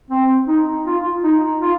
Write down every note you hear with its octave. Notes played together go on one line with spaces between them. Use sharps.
C4
D#4
F4
D#4
F4